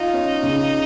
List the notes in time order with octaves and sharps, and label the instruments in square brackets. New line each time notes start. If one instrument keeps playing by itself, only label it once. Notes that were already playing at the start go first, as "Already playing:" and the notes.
Already playing: [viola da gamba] D#4 [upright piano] F4
[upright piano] C#4
C#3